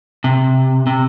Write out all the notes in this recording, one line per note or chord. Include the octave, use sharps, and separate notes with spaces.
C3
C3